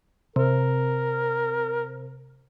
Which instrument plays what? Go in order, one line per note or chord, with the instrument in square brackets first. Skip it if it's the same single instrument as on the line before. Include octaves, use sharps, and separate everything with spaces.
[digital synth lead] C3 [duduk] A#4